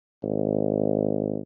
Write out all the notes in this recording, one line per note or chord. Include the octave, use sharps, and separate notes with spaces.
G#1